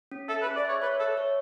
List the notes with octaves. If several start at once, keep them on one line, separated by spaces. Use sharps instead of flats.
C#4
A4 E5
B4
G#4
D5
C#5 E5
B4 C#5
A4 E5
C#5